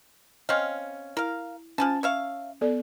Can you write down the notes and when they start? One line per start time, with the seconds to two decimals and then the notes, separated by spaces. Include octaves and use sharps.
0.49 C4 C#4 D#5 F5
1.17 E4 A#4 F5
1.78 F3 C#4 G#5 A5
2.03 C#5 E5 F5
2.61 B3 A4 D5